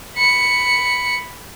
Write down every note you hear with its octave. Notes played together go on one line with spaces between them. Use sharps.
B5 C#7